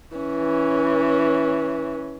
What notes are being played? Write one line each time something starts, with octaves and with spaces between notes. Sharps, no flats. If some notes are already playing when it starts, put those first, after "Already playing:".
E3 C#4